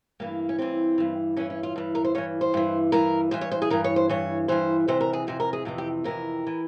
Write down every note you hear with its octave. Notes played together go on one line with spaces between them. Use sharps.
G2 E3 A#3
C#4
G2 E3 C4
G2 E3
G2 E3 C#4
C#4
F4
G2 E3
A#4
C5
G2 E3 C#5
C5
G2 E3
G2 E3 A#4
G2 E3 C5
C#5
C5
G#4
G2 E3 A#4
C#5
C5
G2 E3 C#5
G2 E3 C5
F2 C3 E3 C5
A#4
G#4
F2 C3 E3 C5
A#4
G#4
F2 C3 E3
G4
F2 C3 E3 A#4
E3